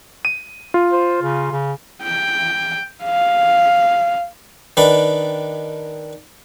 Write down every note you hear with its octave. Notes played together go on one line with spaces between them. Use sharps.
D#7
F4
C5
C#3
C#3
G5
F5
D#3 D4 B4